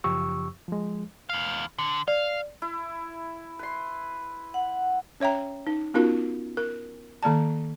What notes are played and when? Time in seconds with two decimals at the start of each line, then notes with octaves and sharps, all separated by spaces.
0.04 F#2 C#3 F3 G4 C#6 E6
0.68 F3 G#3
1.29 E2 F5
1.78 D3
2.08 D5 F5
2.62 E4
3.59 B4 C6
4.54 F#5
5.20 C#4 C#5 E5 G5 A#5
5.67 D#4
5.94 B3 C#4 D#4 F4 F#4 A#4
6.57 A#4
7.23 D#3 A#3 D5 A5